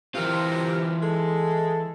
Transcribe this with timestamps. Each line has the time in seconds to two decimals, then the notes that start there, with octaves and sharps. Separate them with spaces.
0.15 C3 E3 F4 G4 A#4
1.02 G#3 A4